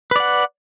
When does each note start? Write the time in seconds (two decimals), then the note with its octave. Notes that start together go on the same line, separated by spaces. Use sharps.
0.11 B4
0.16 D5
0.20 F#5